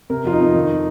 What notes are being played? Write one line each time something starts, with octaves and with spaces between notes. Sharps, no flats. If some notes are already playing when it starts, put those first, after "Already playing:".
C3 A#4
F2 F4
D#4
F2
D#3